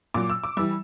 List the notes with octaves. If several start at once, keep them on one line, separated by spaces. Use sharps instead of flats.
A#2 F#3 D6
E6
D6
E3 G3 E6